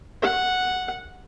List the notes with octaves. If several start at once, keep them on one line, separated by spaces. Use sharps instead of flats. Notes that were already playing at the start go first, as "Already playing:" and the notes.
F#5